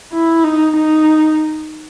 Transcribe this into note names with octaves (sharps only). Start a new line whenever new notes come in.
E4
D#4
D#4